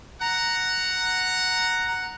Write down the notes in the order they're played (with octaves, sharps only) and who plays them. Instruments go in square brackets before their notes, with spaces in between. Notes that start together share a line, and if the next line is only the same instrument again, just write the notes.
[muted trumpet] F#5 [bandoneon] A#5